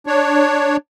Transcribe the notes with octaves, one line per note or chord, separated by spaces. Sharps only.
D4 C#5